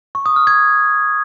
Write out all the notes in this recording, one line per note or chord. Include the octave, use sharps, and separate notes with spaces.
C#6
D#6
F6
G#6